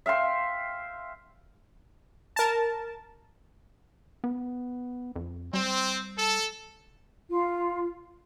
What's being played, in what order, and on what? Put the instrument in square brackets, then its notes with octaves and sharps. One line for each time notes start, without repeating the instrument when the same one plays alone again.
[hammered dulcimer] E5 F5 G5 C6
[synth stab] A#4 A5
[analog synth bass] B3
F2
[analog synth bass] G3 [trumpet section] C4
[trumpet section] A4
[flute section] F4